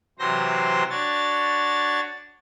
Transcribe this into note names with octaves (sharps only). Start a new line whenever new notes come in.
C3 E3 F#3 C5 C6 A#6
D4 F#4 C#5 A6